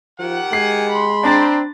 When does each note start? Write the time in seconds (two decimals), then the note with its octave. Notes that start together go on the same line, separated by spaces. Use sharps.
0.19 D#3 F3 G4 F#5
0.53 G#3 G#5 C7
0.89 B5 C6
1.24 C4 D4 A#5 A6